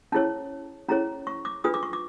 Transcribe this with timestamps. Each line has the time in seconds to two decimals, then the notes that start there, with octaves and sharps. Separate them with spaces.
0.12 C#4 E4 G#4 C#5 A5
0.89 C#4 E4 G#4 C#5 A#5
1.27 C#6
1.45 D6
1.64 D4 F4 G#4 B4 D#6
1.74 D6
1.83 C#6
1.93 D6